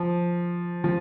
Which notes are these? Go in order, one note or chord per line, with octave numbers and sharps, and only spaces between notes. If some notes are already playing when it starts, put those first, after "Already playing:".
Already playing: F3
F3